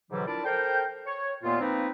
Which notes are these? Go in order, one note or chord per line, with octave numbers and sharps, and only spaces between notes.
G#2 B2 D3 E3 F#3 G3
D4 E4 F4 A#4 D5 A5
A4 A#4 C5 G5
C#5
D#2 A#2 A#3 B3 F4
F3 A#3 C4 D#4 B4